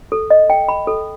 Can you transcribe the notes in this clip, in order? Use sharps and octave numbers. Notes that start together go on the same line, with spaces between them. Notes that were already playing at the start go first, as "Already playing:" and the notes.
A4
D#5
G5
B5
A4